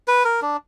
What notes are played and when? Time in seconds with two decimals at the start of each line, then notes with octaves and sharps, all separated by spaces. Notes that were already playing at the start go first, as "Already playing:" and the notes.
0.08 B4
0.25 A#4
0.42 D4